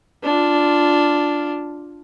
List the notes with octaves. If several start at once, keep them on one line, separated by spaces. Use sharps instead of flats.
D4 F4